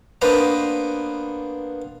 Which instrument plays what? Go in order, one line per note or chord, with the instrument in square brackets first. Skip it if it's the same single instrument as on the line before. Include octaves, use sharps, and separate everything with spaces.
[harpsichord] A#3 B3 D4 B4 C5 D#5